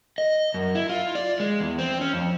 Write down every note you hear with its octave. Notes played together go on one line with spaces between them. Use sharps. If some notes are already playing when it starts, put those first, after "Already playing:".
D#5
F#2
E4
F4
D5
G#3
E2
C4
C#4
F2